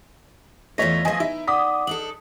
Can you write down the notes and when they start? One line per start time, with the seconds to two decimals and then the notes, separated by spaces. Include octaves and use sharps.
0.78 E2 A3 F4 C#5 D#5 A#6 B6
1.05 F3 A3 D#5 G#5
1.20 D#4 E4
1.48 D5 F#5 D6 D#6 B6
1.87 D4 D#4 A4 F#7